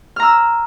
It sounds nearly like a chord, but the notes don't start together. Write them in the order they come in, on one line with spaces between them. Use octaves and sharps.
F6 A#5 E6